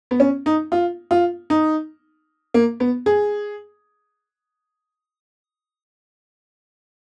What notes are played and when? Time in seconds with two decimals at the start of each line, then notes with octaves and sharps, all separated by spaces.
0.11 B3
0.20 C#4
0.46 D#4
0.72 F4
1.11 F4
1.50 D#4
2.54 A#3
2.80 B3
3.06 G#4